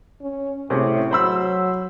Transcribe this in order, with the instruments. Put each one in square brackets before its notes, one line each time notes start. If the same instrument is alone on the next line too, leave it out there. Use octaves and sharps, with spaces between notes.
[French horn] C#4
[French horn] A2 [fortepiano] C3 C#4 G#4
[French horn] F#3 [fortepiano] C5 B5 E6